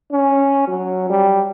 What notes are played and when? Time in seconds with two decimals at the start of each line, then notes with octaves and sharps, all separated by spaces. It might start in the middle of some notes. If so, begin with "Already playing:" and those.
0.12 C#4
0.68 F#3
1.10 G3